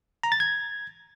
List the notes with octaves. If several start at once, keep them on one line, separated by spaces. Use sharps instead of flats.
A#5
A6
G#6